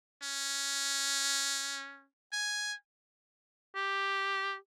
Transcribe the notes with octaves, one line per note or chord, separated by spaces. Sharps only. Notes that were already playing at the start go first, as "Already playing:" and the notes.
C#4
G#5
G4